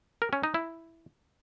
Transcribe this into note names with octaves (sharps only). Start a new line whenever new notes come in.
A#4
C#4
D#4
E4